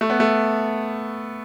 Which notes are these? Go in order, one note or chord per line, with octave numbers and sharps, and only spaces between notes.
A3
B3
A3